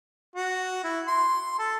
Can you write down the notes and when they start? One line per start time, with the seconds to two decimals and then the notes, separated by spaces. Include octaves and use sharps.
0.36 F#4
0.84 E4
1.08 C6
1.59 A4